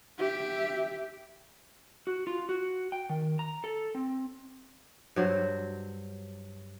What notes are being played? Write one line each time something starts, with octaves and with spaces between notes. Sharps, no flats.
G4 E5
F#4
F4
F#4
G5
D#3
A#5
A4
C4
G2 F#3 C5